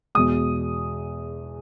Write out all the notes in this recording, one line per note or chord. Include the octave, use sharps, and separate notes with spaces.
E2 B2 G#3 D#6